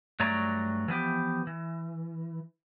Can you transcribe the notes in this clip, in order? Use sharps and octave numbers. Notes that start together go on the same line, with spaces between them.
G2 F#3 A3 C#5 D5 A#5
E3 F3 B3 G4
E3